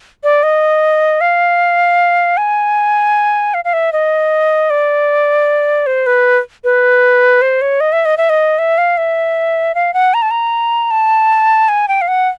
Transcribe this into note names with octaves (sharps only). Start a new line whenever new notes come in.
D5
D#5
F5
G#5
F5
F5
E5
D#5
D5
C5
B4
B4
C5
C#5
D#5
E5
D#5
E5
D#5
E5
F5
E5
F5
F#5
A#5
A5
A#5
A5
G#5
G5
F5
F#5